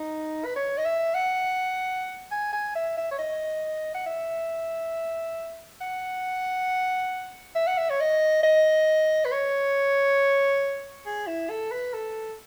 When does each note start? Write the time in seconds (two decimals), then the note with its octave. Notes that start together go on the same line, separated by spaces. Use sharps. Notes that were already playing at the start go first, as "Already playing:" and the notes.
Already playing: D#4
0.45 B4
0.56 C#5
0.77 D#5
0.85 E5
1.15 F#5
2.31 G#5
2.53 G#5
2.75 E5
2.97 E5
3.11 C#5
3.18 D#5
3.94 F#5
4.06 E5
5.81 F#5
7.55 E5
7.67 F#5
7.78 E5
7.90 C#5
8.00 D#5
8.43 D#5
9.25 B4
9.31 C#5
11.06 G#4
11.27 E4
11.49 A4
11.71 B4
11.94 A4